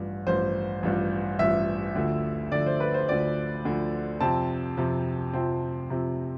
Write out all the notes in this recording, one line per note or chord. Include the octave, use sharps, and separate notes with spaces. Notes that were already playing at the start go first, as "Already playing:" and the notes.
Already playing: A1 G2 F3
A1 G2 F3 C5
A1 G2 F3
A1 G2 F3 E5
D2 D3 F3
D2 D3 F3 D5
C5
B4
C5
D2 D3 F3 D5
D2 D3 F3
F2 C3 F3 C4 A5
F2 C3 F3 C4
F2 C3 F3 C4
F2 C3 F3 C4